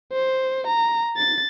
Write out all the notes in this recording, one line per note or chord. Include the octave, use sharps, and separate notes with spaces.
C5
A#5
A6